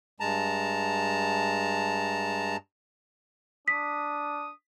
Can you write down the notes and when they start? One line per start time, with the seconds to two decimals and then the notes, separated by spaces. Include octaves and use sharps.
0.20 G2 G#3 A5 A#5
3.68 D4 D#6 B6